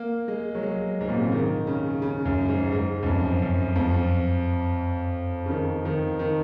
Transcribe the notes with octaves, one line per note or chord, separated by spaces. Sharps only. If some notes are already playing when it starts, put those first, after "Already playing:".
Already playing: A#3
G#3
F#3
G#3
G#2
A#2
C3
C#3
D#3
C#3
C#3
F#2
G#2
G#2
F#2
F2
F#2
F2
C#3
D#3
D#3
D#3